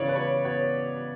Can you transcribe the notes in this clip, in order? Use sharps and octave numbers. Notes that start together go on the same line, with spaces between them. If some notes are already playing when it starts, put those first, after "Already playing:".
Already playing: C#3 E3 B3 C#5 D5
B4
B3 C#5
B3 C#5